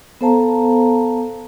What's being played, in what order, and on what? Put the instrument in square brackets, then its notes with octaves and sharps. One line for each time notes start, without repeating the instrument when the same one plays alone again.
[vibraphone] B3 A4 C5 F5 A5 A#5